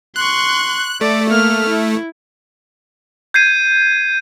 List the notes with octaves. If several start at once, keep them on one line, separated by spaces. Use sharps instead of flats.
C6 C#6 F#6
A3 D5
A#3 F6
E4
G6 G#6 C7 D#7